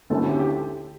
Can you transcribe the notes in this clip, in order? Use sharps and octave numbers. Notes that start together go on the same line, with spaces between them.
D2 D3 A3 C#4 E4 A4
G4
G4